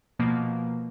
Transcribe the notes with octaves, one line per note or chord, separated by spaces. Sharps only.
B2 F3 A#3